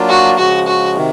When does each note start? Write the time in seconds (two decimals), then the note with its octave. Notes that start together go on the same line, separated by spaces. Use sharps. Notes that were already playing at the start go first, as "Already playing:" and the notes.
Already playing: F#3 A#3 D4 F4
0.09 F#4
0.38 C#3 F3 G#3 F#4
0.67 F#4
0.96 C3 D#3